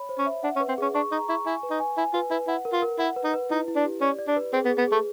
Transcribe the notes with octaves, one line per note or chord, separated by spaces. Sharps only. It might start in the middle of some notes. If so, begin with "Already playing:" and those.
Already playing: C#5 B5
C5
C#4
E5
D4 F#5
C#4
B4
C4
C#4 G#4
D4 C#6
D#4 A#5
E4 C#6
E4 G#5
B4
D#4
G#5
E4 G#5
F4 B4
E4 B4
E4 F#5
A#4
F4
A#4
E4 F#5
B4
D#4
B4
D#4 E4
E4
D4
G4
C#4 D5
D5
D4
B4
C4 G#4
B3
G#4
B3
A3 G#4